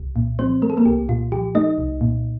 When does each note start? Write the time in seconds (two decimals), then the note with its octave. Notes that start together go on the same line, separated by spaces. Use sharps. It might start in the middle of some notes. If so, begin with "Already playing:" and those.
Already playing: C2
0.16 A#2
0.39 F3 C4 C5
0.62 A3 A#4
0.70 A4
0.77 A#3 A#4
0.85 C2 G4
1.09 A#2 F4
1.32 F3 G4
1.55 A3 D#4 D#5
1.78 C2
2.01 A#2